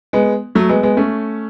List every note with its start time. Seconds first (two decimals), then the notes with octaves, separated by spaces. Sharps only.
0.13 G#3 B3
0.55 F#3 A3
0.69 G#3 B3
0.83 G#3 B3
0.97 A3 C#4